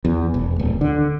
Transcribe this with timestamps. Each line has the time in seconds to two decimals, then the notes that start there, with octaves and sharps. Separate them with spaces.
0.05 E2
0.34 E1
0.59 D1
0.81 D3